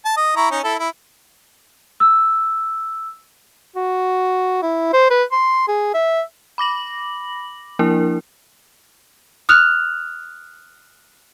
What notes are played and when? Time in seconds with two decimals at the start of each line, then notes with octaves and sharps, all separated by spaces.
0.05 A5
0.17 D#5
0.36 E4 A#5 C#6
0.51 C#4 D#4
0.64 E4 A4
0.79 E4
2.00 E6
3.76 F#4
4.62 E4
4.93 C5
5.10 B4
5.32 C6
5.68 G#4
5.94 E5
6.58 B5 D6 A#6 F#7
7.79 F3 A#3 D4 E4 A#4
9.49 D#6 F6 F#6 F7